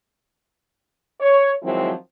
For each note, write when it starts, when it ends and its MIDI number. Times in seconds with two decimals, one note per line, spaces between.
1.20 1.51 73
1.63 1.92 51
1.63 1.92 53
1.63 1.92 54
1.63 1.92 56
1.63 1.92 60
1.63 1.92 64